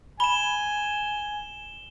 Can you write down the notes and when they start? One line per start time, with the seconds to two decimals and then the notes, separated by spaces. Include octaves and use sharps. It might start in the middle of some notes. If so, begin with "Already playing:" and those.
0.20 G#5 B5 E7 G7